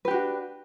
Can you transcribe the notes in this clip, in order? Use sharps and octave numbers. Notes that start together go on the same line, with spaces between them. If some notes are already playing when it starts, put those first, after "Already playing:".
D4 F#4 G4 B4